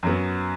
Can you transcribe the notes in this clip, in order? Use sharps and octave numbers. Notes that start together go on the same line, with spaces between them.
F#2 F#3 B3